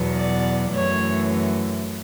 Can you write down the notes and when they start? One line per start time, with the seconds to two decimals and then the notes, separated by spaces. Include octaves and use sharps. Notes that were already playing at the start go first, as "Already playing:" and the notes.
Already playing: E2 B2 F#3
0.18 D5
0.74 F#2 E3 A3 C#5